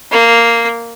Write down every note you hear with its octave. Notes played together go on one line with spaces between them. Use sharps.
A#3